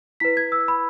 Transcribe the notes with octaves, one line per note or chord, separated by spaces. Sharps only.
E4 B4 B6
G#6
E6
B5